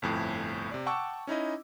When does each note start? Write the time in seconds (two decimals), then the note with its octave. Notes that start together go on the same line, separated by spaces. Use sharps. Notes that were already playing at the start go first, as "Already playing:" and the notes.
0.02 G1 F2 A2
0.71 C3 D5
0.86 F#5 G5 A5 C#6 D6 E6
1.27 C#4 D#4 E4 D#5